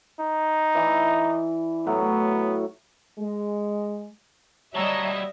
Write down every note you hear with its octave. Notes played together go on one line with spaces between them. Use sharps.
D#4
E3 D5
A2 F#3 B3
G#3
F#3 G3 E4 C#5 D#5 E5 A5 A#5